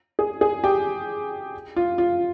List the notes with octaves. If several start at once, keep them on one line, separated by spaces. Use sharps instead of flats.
G#4
G#4
G4
F4
F4